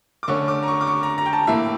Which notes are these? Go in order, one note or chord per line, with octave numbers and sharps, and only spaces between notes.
D6
D3 A3 C#4 C#6
D6
A#5
C#6
D6
C#6
A#5
A#5
G5
A5
A2 E3 A#3 E5